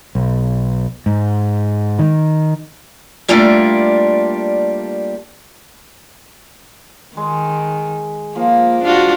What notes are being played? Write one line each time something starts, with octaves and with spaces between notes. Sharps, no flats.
B1
G#2
D#3
G3 A3 A#3 D4 F4 D5
D#3 G#3
F3 A#3
D4 F4 F#4